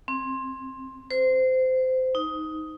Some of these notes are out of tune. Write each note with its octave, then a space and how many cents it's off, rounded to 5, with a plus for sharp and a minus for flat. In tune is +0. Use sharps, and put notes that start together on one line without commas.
C4 +15
C5 -20
D#4 +10